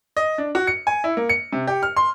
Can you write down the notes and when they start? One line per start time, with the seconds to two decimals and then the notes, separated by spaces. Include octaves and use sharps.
0.17 D#5
0.38 D4
0.55 F#4
0.67 C#7
0.87 G#5
1.04 E4
1.17 A#3
1.29 C#7
1.53 C3
1.67 G4
1.83 F6
1.97 C6